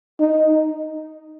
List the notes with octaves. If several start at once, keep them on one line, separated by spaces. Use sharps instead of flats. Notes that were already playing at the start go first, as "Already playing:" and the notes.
D#4